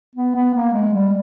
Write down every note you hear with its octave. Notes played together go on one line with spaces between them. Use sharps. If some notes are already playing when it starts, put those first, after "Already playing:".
B3
B3
A#3
G#3
G3